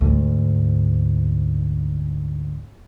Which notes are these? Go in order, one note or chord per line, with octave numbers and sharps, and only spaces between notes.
D2 G#2